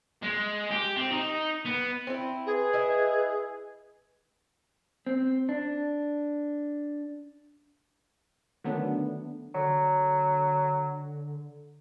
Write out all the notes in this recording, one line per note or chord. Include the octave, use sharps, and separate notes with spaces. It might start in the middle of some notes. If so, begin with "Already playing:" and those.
G#3
G4
C4
D#4
B3
C4 E4
G#4 B4
E4 D#5
C4
D4
D3 D#3 F#3 A3 B3 D4
D3 F#3